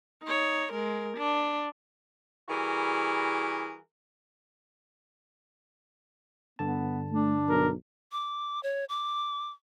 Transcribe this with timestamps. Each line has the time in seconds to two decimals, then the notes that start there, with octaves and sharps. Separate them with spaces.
0.23 D#4 C#5
0.72 G#3 A#4
1.17 D4
2.48 E3 G3 F#4 G#4 A#4
6.59 G2 D3 B3 A5
7.12 A3 D4
7.49 B1 A#4
8.12 D6
8.63 C#5
8.89 D6